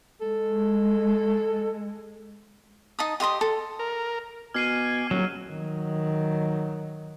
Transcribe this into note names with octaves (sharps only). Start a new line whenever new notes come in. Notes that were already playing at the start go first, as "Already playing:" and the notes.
G#3 A4
D#4 A5 D#6
G4 D#5 C6 D#6
A4
A#4
B2 G#5 D6 F6 G#6 C7 D#7
D#1 F#3
D#3 F#3